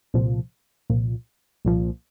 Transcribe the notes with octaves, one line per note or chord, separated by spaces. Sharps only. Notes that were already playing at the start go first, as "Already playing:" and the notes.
C2 A#2 F3
C2 A#2 F3
C2 A#2 F3